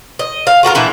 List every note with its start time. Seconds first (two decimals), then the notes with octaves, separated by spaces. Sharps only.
0.19 D#5
0.47 F5
0.63 F4 F#4 A4 A#4
0.75 A#2 E3 D4 E4